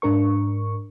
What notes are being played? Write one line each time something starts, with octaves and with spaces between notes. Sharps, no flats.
G#2 D4 A#4 C#6